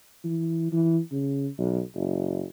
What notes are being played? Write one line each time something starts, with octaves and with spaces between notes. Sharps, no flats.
E3
E3
C#3
B1
F#1